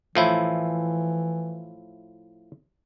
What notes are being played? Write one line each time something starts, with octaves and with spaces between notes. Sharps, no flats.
A2 E3 F3 E4